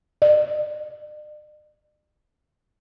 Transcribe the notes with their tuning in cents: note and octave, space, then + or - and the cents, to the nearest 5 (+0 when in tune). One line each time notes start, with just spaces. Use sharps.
D5 +45